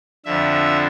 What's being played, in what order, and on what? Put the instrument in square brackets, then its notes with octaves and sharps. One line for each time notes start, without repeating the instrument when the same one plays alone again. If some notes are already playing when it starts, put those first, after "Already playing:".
[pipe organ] F2 D3 E5